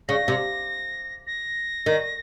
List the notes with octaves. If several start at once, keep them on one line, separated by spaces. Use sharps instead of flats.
C#3 A#6
C3
A#6
D#3